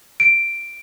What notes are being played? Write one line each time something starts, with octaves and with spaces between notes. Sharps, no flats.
D7